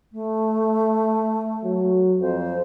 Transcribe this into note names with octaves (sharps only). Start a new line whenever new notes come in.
A3
F#3
F2 C5